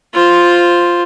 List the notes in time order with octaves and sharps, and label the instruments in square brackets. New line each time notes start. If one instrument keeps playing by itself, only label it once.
[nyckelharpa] F4 C5